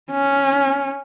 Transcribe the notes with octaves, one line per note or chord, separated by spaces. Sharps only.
C#4